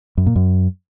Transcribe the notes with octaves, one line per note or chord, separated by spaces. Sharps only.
F#2
A#2
F#2